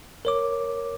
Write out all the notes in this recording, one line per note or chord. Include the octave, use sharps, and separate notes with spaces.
A#4 C#5 D6